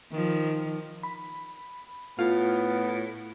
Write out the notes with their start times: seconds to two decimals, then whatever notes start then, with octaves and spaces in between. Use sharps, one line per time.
0.12 D#3 F3
1.03 B5
2.19 A2 B3 F4